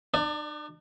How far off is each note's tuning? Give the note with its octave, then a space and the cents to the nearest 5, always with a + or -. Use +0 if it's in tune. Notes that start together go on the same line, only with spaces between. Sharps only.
D4 +45 D5 +15